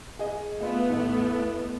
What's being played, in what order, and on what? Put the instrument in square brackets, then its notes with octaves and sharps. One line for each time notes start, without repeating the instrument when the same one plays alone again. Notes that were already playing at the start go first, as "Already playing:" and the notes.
[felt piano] G#4 D#5
[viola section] A3 B3 [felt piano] F4 D#5
[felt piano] A1 E2